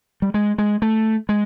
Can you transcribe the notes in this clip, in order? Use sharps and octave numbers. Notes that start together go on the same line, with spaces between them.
G3
G#3
G#3
A3
G#3